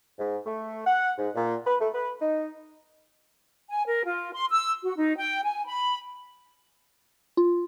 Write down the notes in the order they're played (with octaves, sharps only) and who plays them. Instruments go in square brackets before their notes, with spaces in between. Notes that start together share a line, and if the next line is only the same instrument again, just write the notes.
[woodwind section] G#2
A3
F#5
G#2
A#2
B4
A3
B4
D#4
[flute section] G#5
A#4
F4
C6
E6
F#4
D#4
G5
G#5
B5
[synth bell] F4